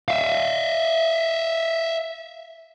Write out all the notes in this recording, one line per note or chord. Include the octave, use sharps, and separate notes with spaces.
E5 F5